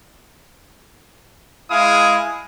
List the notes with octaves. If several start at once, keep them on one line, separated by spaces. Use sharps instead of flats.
G#3 E4 G#4 F5 D#6